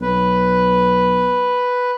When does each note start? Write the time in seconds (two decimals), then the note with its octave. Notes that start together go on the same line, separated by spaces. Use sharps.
0.01 B1 B4